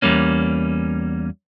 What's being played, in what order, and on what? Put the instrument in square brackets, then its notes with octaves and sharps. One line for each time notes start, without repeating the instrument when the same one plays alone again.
[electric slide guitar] E2 G3 A#3 C#4